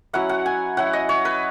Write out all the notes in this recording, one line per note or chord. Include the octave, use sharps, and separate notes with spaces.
F#3 C#4 E4 F#5
F#5
G#5
F#3 C#4 E4 F#5
D#5
C#5
B4